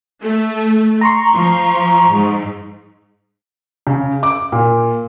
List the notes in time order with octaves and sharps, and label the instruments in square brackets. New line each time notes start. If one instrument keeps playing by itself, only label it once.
[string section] A3
[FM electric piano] A#5 C6 C#6
[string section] F3
G#2
[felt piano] C#3
D6
A#2